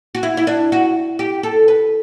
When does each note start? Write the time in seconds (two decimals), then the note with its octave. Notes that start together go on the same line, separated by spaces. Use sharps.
0.15 F#4
0.23 E4
0.37 E4
0.47 D4
0.72 F#4
1.19 G4
1.43 A4
1.68 B4